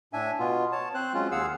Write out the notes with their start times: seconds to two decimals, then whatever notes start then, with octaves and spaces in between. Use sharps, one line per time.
0.13 A2 D4 E5 G#5
0.39 B2 B3 F4
0.72 C#5 A5
0.95 C4 C5 F#6
1.14 F#3 G#3 C#4 F4
1.31 D#2 G#4 F5 F#5 E6